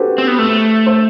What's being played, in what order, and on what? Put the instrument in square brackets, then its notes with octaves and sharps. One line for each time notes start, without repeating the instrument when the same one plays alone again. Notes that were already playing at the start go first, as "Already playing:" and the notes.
Already playing: [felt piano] F#4 G4 A4 B4 C5
[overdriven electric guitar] C4
B3
A3
[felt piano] C5